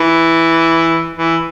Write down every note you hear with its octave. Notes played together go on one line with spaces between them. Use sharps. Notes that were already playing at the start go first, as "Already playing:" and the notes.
Already playing: E3
E3